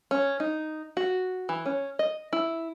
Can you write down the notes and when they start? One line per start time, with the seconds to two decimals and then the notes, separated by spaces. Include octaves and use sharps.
0.11 C#4
0.40 D#4
0.97 F#4
1.49 E3
1.66 C#4
1.99 D#5
2.33 E4